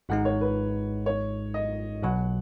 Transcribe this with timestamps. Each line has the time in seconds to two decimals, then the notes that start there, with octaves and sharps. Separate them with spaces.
0.09 G#1 G#2 G#3 D#4 F#5
0.25 C#5
0.41 B4
1.06 C#5
1.54 D#5
2.03 B1 B2 F#3 F#5